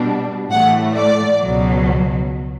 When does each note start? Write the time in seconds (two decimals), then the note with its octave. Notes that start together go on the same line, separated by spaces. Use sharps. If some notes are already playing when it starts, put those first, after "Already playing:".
Already playing: B2 G3 D4
0.51 A2 E3 A3 F#5
0.96 D5
1.42 C#2 B2 F#3